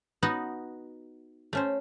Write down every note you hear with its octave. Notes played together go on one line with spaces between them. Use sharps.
B3 D#4 F#4
A3 C#4 C5